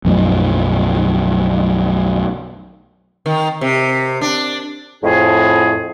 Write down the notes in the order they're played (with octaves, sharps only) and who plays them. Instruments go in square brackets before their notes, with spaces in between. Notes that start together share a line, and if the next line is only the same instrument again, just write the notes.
[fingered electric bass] B1 F#2 F3 A3
[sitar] D#3
C3
D4
[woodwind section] F2 A2 G#4